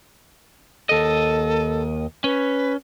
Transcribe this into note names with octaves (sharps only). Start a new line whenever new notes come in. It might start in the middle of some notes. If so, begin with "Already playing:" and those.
D#2 A4 D#5
C#4 B4